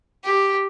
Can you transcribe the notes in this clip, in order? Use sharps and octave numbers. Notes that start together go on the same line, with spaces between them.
G4